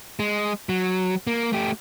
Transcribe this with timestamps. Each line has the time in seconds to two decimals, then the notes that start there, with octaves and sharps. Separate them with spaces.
0.19 G#3
0.69 F#3
1.27 A#3
1.53 A3 G4